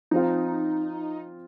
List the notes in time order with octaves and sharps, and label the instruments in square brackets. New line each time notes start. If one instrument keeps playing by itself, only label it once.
[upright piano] F3 C4 F4 [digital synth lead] D#4